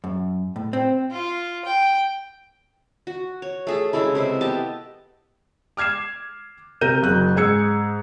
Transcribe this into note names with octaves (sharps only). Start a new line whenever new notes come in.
F#2
A2
C4
F4
G5
F#4
C#5
A3 G#4 A4
C#3 G#3 A3 E4
C3 E4 B4
B3 G4 D#5 A5
D6 F6 G#6 C7 E7
C3 A#4 G6 D#7
F#1 F#2 F#6
G#2 G#4 E6 G#6 C#7